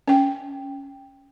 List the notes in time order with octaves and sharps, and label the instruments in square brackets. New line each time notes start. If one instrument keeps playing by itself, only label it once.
[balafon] C#4 G5